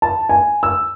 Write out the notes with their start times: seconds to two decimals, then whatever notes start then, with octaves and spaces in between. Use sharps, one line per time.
0.02 A5
0.29 G#5
0.63 E6